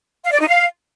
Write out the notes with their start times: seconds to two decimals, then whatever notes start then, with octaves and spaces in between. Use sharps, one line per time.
0.24 F5
0.32 D5
0.40 D#4
0.47 F5